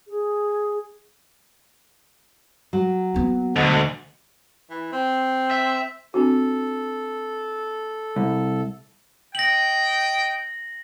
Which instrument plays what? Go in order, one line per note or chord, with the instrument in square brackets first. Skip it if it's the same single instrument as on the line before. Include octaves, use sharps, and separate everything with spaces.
[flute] G#4
[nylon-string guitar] F#3
[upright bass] A#3 B3
[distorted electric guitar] D2 [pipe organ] B2 D3 G#3
[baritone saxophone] E3
C4
[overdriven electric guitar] E5
[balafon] C4 D4 F#4 [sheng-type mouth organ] A4
[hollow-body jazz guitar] C2
[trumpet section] D#5 G5 [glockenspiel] A#6 F#7